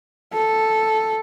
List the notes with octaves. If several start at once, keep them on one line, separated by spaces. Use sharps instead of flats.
A4